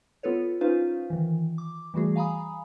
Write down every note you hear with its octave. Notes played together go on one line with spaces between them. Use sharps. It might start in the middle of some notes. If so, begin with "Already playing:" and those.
B3 F4 A4 B4 C#5
C#4 D#4 F4 B4 C5 F5
D#3 E3
D6
E3 G3 A3 F#4 G#4
F5 G#5 A#5 B5 D#6